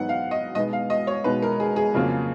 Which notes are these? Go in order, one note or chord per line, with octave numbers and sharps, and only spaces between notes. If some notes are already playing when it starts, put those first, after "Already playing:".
Already playing: G#2 F#3 B3 D#4 F#5
F5
D#5
B2 G#3 B3 D#4 D#5
F5
D#5
C#5
B2 G#3 B3 D#4 B4
A#4
G#4
G#4
F2 C#3 F#3 A#3 F4